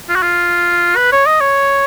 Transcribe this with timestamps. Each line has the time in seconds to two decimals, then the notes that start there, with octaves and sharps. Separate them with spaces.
0.09 F4
0.16 F#4
0.23 F4
0.96 B4
1.12 C#5
1.26 D#5
1.41 C#5